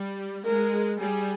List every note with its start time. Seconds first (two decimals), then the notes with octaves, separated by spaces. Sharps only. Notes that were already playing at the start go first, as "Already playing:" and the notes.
Already playing: G3
0.45 G#3 A#4
0.98 G3 G#4